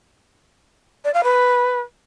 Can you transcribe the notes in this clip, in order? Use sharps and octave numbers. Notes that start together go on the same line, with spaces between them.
D5
F5
B4